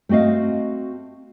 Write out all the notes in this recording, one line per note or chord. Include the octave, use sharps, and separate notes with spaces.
A3 C4 F#4 D#5 F5